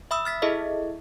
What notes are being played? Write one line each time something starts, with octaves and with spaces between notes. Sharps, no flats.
E5 B5 D#6 E6
F6 A6 B6
E4 G#4 A4 D#5 E5